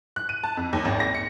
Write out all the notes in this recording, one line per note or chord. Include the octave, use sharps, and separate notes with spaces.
F#6
D#7
A5
F2
D#2
G#1
A#6
C#7